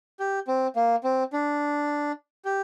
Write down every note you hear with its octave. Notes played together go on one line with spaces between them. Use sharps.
G4
C4
A#3
C4
D4
G4